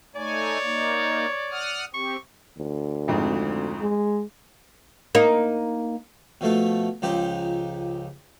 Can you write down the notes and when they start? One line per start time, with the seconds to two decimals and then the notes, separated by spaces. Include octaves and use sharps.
0.15 A3 D#4 C#5 D5 G#5
0.63 A#3 D#4
1.51 F#5 D#6 F6
1.94 C4 G4 C#6
2.58 D2
3.08 G#1 F2 G#2
3.80 G#3
5.15 A#3 D#4
6.41 B2 F3 A3 F5
7.02 C#2 F3 D#4 G4 C5